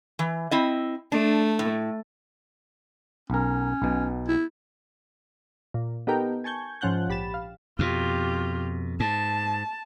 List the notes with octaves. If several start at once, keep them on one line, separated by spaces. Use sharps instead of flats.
E3
C4 E4 D#5
A3 D4
A2
B1 C#4 A#4
B1 B2
E4
A#2
B3 D#4 G4 A4 A#4 G5
G#5 A5 C#6 G6 G#6
G#2 F3 C#4 F#5 F#6 G6
A#1 G4 B5 A6 E7
F5
F2 B2 F4 G4
G#2 A5